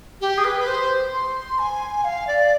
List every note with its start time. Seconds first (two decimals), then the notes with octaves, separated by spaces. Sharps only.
0.21 G4
0.38 G#4
0.44 B4
0.60 B4
0.67 C5
1.13 C6
1.59 G#5
2.04 F5
2.27 D5